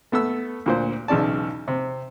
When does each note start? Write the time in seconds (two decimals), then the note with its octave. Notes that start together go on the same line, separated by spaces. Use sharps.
0.12 A3 B3 A4 E6
0.66 D2 A#2 C5
1.08 B1 E2 C#3 D5 A5
1.68 C3